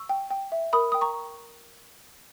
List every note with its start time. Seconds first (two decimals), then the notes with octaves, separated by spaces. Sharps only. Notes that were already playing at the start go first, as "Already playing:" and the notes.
Already playing: C#6 E6
0.09 G5
0.31 G5
0.52 E5
0.73 A#4 B5 D#6
0.92 G5 D#6
1.01 A#5 C#6